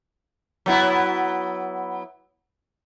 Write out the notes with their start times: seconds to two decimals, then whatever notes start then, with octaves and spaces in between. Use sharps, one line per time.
0.66 F#3 B3 E4